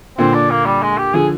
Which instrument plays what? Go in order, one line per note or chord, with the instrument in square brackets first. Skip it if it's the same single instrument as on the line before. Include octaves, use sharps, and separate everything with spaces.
[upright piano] A#2 D3 [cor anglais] C4
[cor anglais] D4
A#3
G3
G#3
G4
[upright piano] D3 F3 [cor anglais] G#4